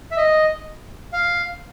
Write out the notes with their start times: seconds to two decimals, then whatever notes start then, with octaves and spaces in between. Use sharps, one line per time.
0.11 E5
0.17 D#5
1.13 F5